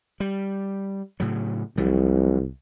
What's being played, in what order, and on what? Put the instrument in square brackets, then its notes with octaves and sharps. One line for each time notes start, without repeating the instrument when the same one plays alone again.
[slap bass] G3
A2 C#3 F#3
[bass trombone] C2 [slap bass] C3 F3 F#3